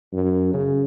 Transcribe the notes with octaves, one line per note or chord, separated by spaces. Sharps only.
F#2
C#3